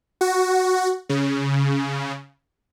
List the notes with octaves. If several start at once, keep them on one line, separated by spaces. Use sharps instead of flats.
F#4
C#3